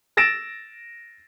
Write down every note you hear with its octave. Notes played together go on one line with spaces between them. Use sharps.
E6 A6 A#6 D7 E7